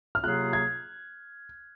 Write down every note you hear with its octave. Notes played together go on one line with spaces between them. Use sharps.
F6
C3 F#3 A#3 F4 G#4 F#6
G#6